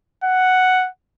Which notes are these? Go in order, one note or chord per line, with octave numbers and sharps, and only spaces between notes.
F#5